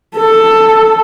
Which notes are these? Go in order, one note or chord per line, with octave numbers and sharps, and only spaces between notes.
A4